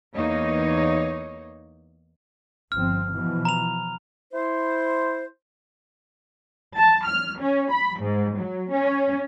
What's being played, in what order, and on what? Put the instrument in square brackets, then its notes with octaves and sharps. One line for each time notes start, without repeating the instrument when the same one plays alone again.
[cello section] E2 A#3 D#4 C#5
[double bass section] G1 F3 C4 [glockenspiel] F6
[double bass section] B2 E3 F3
[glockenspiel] A#5 B5 F7
[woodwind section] E4 C5
[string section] A5
F6
C#4
B5
G#2
F#3
C#4